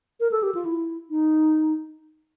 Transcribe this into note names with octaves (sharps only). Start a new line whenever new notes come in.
A#4
A4
G4
F4
E4
D#4